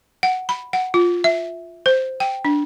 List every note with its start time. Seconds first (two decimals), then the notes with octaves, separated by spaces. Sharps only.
0.23 F#5
0.49 B5
0.73 F#5
0.94 F4
1.24 E5
1.86 C5
2.20 G5
2.45 D4